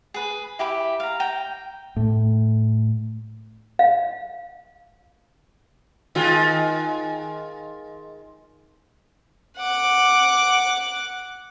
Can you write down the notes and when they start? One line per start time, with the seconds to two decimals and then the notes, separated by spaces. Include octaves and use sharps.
0.14 G#4 B4
0.59 E4 G4 E5 B5
1.00 F5 A#5
1.20 G5 A#5
1.96 A2
3.79 F5
6.15 D#3 G#3 F4
9.57 F#5 D6